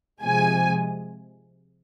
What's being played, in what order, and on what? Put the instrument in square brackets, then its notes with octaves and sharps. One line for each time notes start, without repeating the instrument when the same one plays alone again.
[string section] C3 F3 G#3 G#5